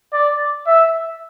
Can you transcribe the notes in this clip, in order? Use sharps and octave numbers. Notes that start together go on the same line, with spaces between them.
D5
E5